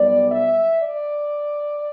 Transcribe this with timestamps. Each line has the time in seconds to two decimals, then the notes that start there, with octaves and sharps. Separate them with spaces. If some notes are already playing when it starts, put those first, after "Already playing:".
Already playing: B1 B2 G3 B3 D5
0.30 E5
0.80 D5